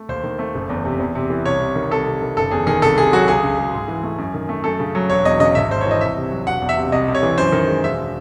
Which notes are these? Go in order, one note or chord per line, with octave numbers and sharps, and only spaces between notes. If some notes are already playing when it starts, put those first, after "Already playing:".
Already playing: A3
D#2 C5
D#3
A3
F#1
E2
C3
E2
C3
E3
C2 C#5
C3
D#3
C2 A4
C3
D#3
F#1 A4
E2 G#4
D#3 G#4
C2 A4
C3 G#4
F#3 F#4
C#2 G#4
C#3
G#3
G#2
E3
A3
F#2
D#3
A3
F#2 A4
C#3
F#3
E1 C#5
E2 D#5
C#3 D#5
G#1 E5
G#2 C5
E3 C#5
D#5
C2 E5
C3
F#3
E1 F#5
E2
E5
C3
C2 D#5
C3
C#5
E3
F#2 C5
D#3
G#3
E1 E5